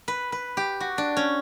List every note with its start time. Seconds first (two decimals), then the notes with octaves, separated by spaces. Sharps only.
0.08 B4
0.32 B4
0.57 G4
0.80 F#4
0.98 D4
1.17 C#4